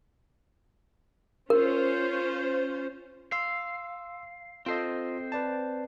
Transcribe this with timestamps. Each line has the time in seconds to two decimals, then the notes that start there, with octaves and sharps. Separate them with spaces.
1.50 C#4 F4 A#4 C5
3.32 F5 C6 E6
4.66 C4 F4 A4 C5 D#5
5.32 B4 D5 A5